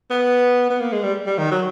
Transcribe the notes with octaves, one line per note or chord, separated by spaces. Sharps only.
B3
B3
A#3
G#3
G3
G3
D#3
F#3